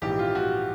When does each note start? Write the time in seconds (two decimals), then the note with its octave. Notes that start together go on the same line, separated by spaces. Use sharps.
0.02 A#1 G#2 E3 G4
0.19 F4
0.35 F#4